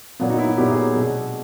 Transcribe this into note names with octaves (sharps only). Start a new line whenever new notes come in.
A#2 F#3 B3 F4
D#4
E4
E4
A#2 F#3 B3 G4
G#4
B2 G#3 C4